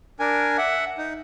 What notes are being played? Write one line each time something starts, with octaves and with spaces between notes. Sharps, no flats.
D4 A#4 G#5
E5 F#5
D#4